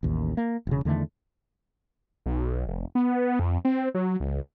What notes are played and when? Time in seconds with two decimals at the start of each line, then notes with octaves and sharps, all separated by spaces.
0.03 A1 D#2
0.37 A#3
0.67 E1 C#3
0.85 E2 D3 D#3 A3
2.26 B1
2.67 F1
2.95 B3
3.39 F2
3.65 C4
3.94 F#3
4.20 C#2